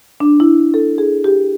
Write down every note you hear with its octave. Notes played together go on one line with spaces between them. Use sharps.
D4
E4
A4
G#4
G4